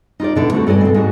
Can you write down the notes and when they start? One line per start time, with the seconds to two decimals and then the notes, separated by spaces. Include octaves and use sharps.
0.20 D#4 F4 G4 D5
0.35 B2 D3 E4
0.53 A3 C4 F#4
0.67 G2 A4 D5 D#5 G#5
0.81 B2 C4
0.94 G#2 D#4 F#4